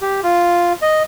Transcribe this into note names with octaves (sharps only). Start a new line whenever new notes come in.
G4
F4
D#5